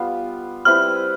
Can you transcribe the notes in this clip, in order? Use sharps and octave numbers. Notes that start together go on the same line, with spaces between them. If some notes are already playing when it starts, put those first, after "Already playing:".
Already playing: G3 B3 F4
G3 C4 E4 B4 F6